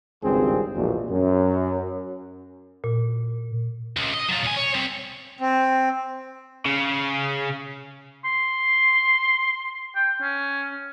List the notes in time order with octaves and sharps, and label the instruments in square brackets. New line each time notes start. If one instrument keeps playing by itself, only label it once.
[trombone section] G#1 C#2 G2 C4 G#4
A#1 E2 B2
F#2
[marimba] A#2
[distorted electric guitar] C#2
D#5
F#3 F4
B1 G#5
C#5
G3 C4
[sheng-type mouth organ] C4
[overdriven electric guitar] C#3
[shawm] C6
G5
C#4